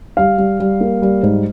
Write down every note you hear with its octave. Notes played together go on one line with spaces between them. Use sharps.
G3 F5
G3
G3
A#3
G3
G#2